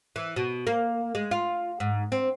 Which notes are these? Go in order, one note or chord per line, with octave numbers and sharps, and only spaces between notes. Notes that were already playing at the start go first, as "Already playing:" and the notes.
E3
B2
A#3
G#3
F4
G#2
C4